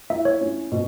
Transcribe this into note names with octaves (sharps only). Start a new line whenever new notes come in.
E4 E5
C#5
C#4
B2